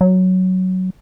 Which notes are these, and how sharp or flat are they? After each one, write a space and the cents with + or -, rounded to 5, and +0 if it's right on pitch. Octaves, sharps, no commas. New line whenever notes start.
F#3 +5